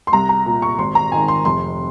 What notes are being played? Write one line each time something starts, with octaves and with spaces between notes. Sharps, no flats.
C6
C2 A#5
A#5
A#2
C#6
G#1 C6
A#5
G#2 D#3 G#5
C6
F1 C6